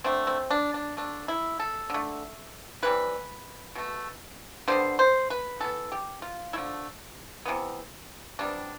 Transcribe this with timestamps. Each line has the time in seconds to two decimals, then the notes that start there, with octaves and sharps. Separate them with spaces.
0.04 D3 A3 C4
0.27 C4
0.51 D4
0.74 D4
0.97 D3 A3 D4
1.28 E4
1.60 A4
1.90 D3 A3
2.83 C3 E3 G3 B4
3.75 B2 A3
4.68 D3 G3 B3 C5
4.99 C5
5.30 B4
5.60 E3 B3 A4
5.92 G4
6.22 F4
6.53 D3 F3 A3 E4
7.46 C3 E3 B3
8.39 C3 G3 B3 D4